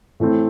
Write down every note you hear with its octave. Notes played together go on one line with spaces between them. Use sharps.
A2 E3 A3 C4